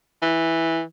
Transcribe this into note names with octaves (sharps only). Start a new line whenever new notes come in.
E3